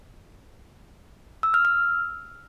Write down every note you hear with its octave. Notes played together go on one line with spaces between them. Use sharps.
E6
F6
F6